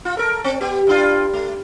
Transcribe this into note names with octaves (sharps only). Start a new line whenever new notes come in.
F4
A4 A#4
C4
B3 G4
G2 D4 F4
A3